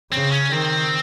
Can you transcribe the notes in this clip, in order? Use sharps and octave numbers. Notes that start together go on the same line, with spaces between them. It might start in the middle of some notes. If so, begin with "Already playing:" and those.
C#3 C4
C#4
D#3 C4